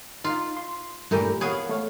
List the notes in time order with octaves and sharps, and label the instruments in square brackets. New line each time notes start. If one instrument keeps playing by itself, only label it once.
[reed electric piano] D#4 F5 [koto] F4
[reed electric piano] C6
[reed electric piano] G2 A3 A#5 [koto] A#2 E3 G4
[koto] B3 G#4 [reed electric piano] C#5 F5 F#5
[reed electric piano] A3 C#5 F5